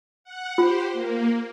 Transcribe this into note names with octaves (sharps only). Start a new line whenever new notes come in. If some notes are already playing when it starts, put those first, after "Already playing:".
F#5
F4 G4 C5
A#3